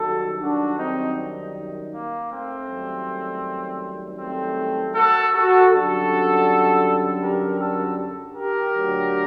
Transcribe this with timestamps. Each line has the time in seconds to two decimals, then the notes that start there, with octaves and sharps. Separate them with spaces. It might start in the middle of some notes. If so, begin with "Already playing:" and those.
Already playing: F#2 D#3 G3 F#4 A4
0.41 D4 F#4
0.79 C4 D#4
1.93 A#3
2.30 A3 C4
2.68 F#2 D#3 G3
4.19 A3 C4
4.95 F#4 A4
5.33 F#4 A4
5.70 F#2 D3 G3 F#4 A4
7.22 G4 A#4
7.60 F#4 A4
8.35 G4 A#4
8.74 D2 D3 F#3